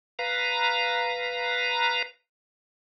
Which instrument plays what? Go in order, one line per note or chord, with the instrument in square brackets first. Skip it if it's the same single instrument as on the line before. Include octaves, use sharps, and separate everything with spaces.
[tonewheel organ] B4 F5 A#5